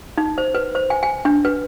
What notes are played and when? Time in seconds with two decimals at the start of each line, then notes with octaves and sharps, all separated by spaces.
0.17 D#4
0.38 C5
0.55 B4
0.75 C5
0.90 G#5
1.03 G#5
1.25 D4
1.45 B4